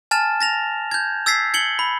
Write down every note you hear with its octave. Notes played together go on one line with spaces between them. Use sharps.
G#5 A5 F6 A6 E7
A6 A#6 F7
G6 G#6
E6 G#6 A6 B6 C7
G#6 C#7 F#7 G7
B5